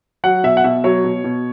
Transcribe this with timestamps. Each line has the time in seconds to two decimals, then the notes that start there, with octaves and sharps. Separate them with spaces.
0.24 F#3 F#5
0.44 B2 E5
0.57 F#5
0.64 B2 E5
0.84 F#3 C#5
1.04 B2
1.24 B2